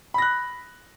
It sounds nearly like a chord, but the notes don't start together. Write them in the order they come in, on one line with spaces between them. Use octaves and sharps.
B5 A#6 F#6